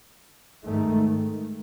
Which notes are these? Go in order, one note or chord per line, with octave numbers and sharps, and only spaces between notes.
G#2 D#3 A3